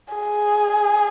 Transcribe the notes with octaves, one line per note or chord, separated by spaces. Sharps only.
G#4